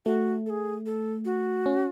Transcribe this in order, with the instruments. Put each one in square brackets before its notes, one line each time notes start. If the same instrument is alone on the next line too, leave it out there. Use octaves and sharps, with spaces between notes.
[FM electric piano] A3 [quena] F#4
[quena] A4
G#4
A4
F#4
[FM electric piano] C#4